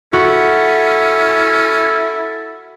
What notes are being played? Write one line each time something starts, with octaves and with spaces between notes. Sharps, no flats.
C#4 E4 F#4 A4